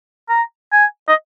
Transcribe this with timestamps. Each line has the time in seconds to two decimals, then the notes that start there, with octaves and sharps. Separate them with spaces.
0.29 A#5
0.72 G#5
1.08 D#5